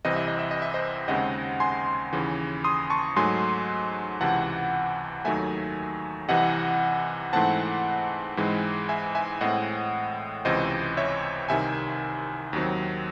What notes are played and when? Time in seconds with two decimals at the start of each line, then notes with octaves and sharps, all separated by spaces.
0.05 C2 C3 E3 C4 D#5
0.16 E5
0.28 D#5
0.39 E5
0.51 D#5
0.62 E5
0.74 C5 D#5
1.08 D#2 C#3 G#3 C4 D#5 F#5
1.60 G#5 C6
2.13 D#2 C#3 E3
2.64 C6 D#6
2.90 A5 C#6
3.17 G#2 F#3 A3 G#5 C6
4.21 C#2 C3 E3 F#5 A5
5.25 D#2 D#3 F#3 A3 E5 G#5
6.28 C2 C3 E3 D#5 F#5
7.33 G#2 E3 A3 C4 F#5 A5
8.37 G#2 E3 G#3 C4
8.89 E5 G#5
9.15 E5 G#5
9.41 A2 G#3 C4 D#5 F#5
10.45 C#2 C3 E3 C4 C5 D#5
10.97 C#5 E5
11.48 C2 C3 D#3 E5 G#5
12.53 D#2 D#3 F#3 C4